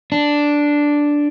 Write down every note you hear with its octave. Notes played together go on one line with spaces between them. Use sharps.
D4